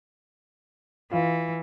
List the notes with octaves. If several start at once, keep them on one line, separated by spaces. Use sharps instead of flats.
E3 F4 F5